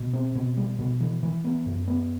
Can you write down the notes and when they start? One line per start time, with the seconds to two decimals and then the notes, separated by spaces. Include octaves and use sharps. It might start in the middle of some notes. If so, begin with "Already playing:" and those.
Already playing: B2
0.13 C4
0.35 B2
0.57 G3
0.79 B2
1.00 E3
1.23 E3
1.44 B3
1.66 F#2
1.88 B3